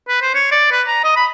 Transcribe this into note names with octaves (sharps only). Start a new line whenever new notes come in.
B4
C5
C#5
D5
B4
A#5
D#5
B5